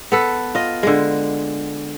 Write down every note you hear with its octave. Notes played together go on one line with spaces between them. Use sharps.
B3 A4 B4
F4 D#5
D3 G#3